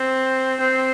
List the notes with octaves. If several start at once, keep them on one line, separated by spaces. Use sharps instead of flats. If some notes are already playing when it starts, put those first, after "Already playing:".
Already playing: C4
C4